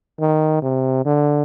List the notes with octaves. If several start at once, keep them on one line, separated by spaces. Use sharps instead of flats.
D#3
C3
D3